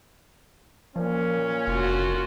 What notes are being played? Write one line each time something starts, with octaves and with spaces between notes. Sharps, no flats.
A#2 F3 A#3 C#4
F1 F4 F#4